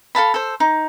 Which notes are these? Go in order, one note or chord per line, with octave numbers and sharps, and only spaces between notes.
A4 F5 A5 B5
A4 C5
D#4